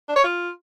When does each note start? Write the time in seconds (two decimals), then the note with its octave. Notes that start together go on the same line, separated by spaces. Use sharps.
0.08 D4
0.16 C#5
0.24 F4